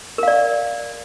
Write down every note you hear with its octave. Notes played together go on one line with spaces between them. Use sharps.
A#4 D5 F5